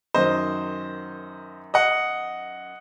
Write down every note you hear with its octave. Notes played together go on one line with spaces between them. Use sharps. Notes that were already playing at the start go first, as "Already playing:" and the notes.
F#2 D#3 F#3 C5 D#5
D#5 F#5